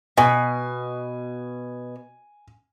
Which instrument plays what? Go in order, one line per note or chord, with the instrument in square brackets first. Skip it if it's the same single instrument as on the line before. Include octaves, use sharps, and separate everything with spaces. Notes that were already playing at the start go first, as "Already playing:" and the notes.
[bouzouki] B2 [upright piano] G#5